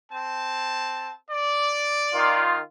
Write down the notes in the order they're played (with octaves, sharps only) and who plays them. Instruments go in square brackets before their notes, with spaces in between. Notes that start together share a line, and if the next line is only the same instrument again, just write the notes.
[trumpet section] C4 A5
D5
[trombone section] D#3 F4